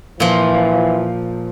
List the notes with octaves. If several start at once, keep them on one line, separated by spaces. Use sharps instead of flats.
A#2 E3 F3